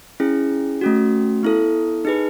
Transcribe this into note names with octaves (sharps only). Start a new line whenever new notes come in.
C#4 E4 G#4
A3 C#4 F#4
B3 E4 A4
D#4 G#4 B4